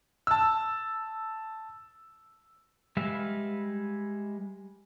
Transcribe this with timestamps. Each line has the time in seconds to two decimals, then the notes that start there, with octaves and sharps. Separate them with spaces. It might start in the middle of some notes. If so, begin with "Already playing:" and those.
0.27 A5 E6
2.97 G3 G#3 B4 E5 F5